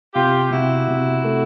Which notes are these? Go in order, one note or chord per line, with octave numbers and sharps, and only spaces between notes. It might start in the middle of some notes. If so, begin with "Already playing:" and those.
C3 F4 G4
C3 E4 F#4
C3
A3